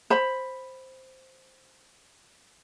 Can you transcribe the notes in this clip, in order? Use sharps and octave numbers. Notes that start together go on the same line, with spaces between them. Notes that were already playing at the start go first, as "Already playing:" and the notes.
C5 B5